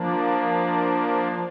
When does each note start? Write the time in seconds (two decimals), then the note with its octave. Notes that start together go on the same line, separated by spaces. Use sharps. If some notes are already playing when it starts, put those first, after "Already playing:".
Already playing: F3 A#3 D4